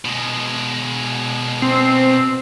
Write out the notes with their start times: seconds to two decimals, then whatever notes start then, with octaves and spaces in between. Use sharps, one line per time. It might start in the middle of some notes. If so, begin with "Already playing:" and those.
0.05 B2 G#3
1.62 C4